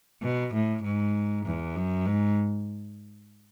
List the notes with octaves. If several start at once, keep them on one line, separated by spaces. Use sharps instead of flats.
B2
A2
G#2
E2
F#2
G#2